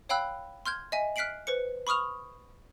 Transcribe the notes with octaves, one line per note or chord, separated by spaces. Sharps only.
C#5 F5 G5 B5 E6 F#6
C6 F6 G6 G#6
D#5 E5 G#5
F6 F#6 B6 C7 D7 F#7
B4 C5 C#7
B5 C#6 D#6 F6 F7